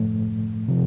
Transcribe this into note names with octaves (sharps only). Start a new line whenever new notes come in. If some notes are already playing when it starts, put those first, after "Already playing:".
Already playing: A2 F3 A3
C3 F3